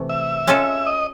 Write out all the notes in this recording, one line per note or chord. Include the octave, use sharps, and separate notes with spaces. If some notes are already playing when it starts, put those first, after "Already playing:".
Already playing: C3 E3 A3
E5
G#3 C#4 F4 A4
D#5